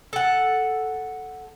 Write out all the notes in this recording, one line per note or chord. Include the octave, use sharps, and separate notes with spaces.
A4 F#5